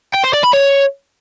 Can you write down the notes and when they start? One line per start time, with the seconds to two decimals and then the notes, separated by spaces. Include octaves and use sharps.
0.14 G5
0.24 C5
0.33 D5
0.43 B5
0.53 C#5